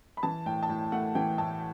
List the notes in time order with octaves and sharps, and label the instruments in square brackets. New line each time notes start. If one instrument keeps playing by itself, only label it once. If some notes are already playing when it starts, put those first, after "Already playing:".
[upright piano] B5
E3 A5
A2 G5
A5
A2 G5
A3 F#5
E3 G5
A2 A5